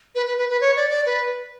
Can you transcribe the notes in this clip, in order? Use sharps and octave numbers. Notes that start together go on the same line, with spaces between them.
B4
B4
B4
B4
C#5
D5
D5
B4